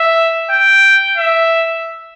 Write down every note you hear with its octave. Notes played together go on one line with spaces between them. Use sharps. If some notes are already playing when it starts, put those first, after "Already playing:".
Already playing: E5
G5
E5